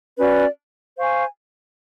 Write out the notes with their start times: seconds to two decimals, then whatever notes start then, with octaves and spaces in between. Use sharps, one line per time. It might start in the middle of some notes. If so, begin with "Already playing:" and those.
0.18 C#4 F#4 B4 D5
0.97 C5 F5 G#5 C#6